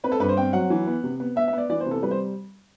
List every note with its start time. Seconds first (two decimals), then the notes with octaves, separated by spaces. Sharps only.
0.04 C4 B4
0.12 A4
0.20 G2 B4
0.29 C5
0.37 C4 G5
0.53 F#3 F#5
0.70 E3
0.87 B3
1.04 C3
1.20 B3
1.36 B3 E5
1.48 E5
1.53 B3 D5
1.70 E3 D5
1.80 C5
1.86 C3
1.91 A4
2.03 G3 B4
2.11 C5